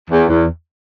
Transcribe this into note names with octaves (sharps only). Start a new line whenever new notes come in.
E2
E2